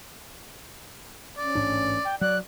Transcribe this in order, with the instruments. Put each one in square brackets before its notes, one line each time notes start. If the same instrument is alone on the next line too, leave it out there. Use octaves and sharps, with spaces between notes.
[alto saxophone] C#4 [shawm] D5
[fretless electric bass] A1 G#2 D4
[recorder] G5
[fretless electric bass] F#3 [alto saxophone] D5 [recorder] F#6